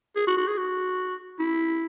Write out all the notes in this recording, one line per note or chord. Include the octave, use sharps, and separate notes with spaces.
G#4
F#4
F#4
G#4
F#4
E4